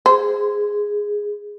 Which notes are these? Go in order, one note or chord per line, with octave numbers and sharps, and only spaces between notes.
G#4 C5